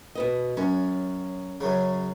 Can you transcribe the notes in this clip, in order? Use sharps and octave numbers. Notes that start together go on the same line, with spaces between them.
B2 B4 D#5
F#2 C#4
F#2 C#3